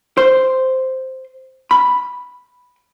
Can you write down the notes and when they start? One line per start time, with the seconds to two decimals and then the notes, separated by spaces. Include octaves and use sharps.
0.17 C5
1.71 B5